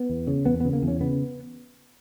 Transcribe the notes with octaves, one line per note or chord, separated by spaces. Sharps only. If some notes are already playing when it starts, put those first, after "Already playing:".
Already playing: B3
E2
C#3
E2 B3
C#3 B3
A#3
E2
C#4
C#3 B3